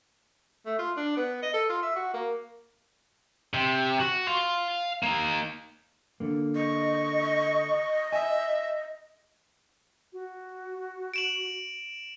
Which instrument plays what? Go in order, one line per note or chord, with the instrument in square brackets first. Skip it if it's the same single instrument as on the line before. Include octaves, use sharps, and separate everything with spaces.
[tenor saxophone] A3
F4
D4
B3
D#5
A4
F4
E5
F#4
A#3
[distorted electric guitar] C3
F#4
F5 C6
A#3 D#4
[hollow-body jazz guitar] D3 A#3
[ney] D#5 [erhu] C#6
[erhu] E5 [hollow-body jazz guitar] G#5
[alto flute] F#4
[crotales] D7 E7 F#7